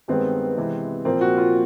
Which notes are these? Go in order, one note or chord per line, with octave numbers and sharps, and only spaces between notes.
G2 D#3 G#3 B3 C4
C3 E3 G#3 B3
A#2 F3 A#3 C4
F#4
F4